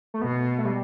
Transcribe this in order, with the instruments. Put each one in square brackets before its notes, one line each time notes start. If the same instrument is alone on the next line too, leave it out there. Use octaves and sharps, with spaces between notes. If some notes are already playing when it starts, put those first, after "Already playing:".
[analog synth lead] A3
[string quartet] B2 [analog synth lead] B3
[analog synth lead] A3
G3